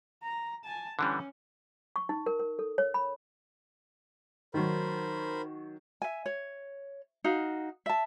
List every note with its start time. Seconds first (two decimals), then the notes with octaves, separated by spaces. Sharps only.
0.22 A#5
0.64 G#5 A5
0.99 D3 E3 G3 C#4
1.96 C#6
2.09 D#4
2.26 A#4
2.40 A#4
2.59 A4
2.78 C#5
2.94 B5
4.54 D#3 F#3 A#4 C5 B5
6.02 E5 G#5
6.26 C#5
7.24 D#4 F#4 F5
7.86 E5 A5